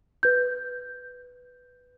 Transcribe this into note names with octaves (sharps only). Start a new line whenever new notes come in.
B4 G6